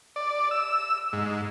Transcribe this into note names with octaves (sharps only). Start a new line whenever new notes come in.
D5
E6
G#2